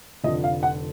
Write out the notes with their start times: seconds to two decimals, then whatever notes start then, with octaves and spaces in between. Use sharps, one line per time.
0.24 F1 F2 D3 F3 D#5
0.44 F5
0.63 F#5